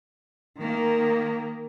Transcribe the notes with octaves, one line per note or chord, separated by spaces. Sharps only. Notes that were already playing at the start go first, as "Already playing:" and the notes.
D#3 A#3